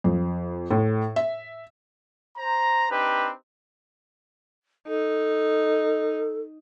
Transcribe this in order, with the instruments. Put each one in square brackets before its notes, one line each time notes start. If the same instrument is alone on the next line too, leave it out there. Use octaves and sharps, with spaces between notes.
[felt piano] F2
A2
E5
[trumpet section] C5 A#5
C4 D4 D#4 G4 B4
[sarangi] D#4 [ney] A4